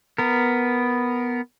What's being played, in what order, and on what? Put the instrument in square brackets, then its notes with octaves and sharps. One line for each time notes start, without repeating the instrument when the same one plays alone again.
[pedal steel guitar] B3 A#4